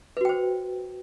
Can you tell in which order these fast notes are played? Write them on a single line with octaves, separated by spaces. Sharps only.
B4 F#4 G5 C5